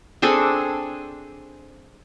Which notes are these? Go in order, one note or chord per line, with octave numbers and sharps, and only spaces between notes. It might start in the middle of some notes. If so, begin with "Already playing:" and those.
C4 D4 G#4 A4